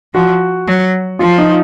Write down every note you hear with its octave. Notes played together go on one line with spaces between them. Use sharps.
F3 F#4
F#3
F3 F4
D#4